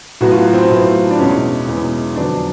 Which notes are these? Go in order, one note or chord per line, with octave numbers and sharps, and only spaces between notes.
A2 F#3 B3 F#4
F4
F#4
C4
A2 F#3 B3
D4
E2 B2 G#3 B3 C#4
E2 B2 G#3 B3
F2 D3 F#3 B3 D4